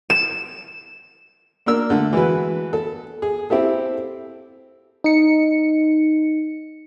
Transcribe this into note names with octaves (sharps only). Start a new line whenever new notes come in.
E7
A#3 D4 A#4 E6
D3 A3
E3 G#3 F#4 B4
A4
G#4
C4 E4 G4 A4
D#4 C#7